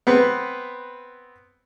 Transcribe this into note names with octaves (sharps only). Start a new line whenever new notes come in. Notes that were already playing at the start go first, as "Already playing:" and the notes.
B3 C4 B4